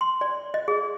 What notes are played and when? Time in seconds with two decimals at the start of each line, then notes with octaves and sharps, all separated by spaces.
0.01 C6
0.21 D5
0.54 D#5
0.68 G#4